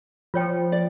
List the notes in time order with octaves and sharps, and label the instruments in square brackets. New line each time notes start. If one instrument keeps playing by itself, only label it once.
[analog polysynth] F3 [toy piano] F4 C#5 G5
[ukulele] D5